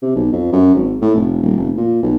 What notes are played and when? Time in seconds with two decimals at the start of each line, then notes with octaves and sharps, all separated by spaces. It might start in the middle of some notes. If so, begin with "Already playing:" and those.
0.02 C3
0.15 B1
0.32 F2
0.52 F#2
0.75 G#1
1.01 A2
1.15 F1
1.42 D#1
1.57 F1
1.77 A#2
2.02 B1